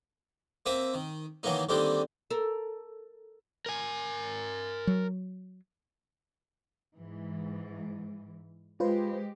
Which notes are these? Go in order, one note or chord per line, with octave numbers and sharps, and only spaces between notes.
A#3 C4 E5 D#6
D#3
D#3 E3 F#3 A#3 D#4
D3 D#3 G3 A#3 C4 D4
A4 A#4
A#4 G#5
F#3
G#2 E3
G#3 F4 G4 B4 C5